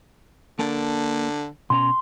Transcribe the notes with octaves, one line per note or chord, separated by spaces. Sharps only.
D3 A#3 A#4 A5
B2 C#4 A#5 C6